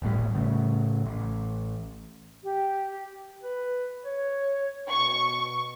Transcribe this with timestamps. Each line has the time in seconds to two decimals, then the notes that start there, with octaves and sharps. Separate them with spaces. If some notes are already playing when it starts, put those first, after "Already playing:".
0.02 D#1 G#1 A2 G3
0.35 A2 C#3 A3
1.06 A1
2.44 G4
3.43 B4
4.05 C#5
4.91 B2 C#6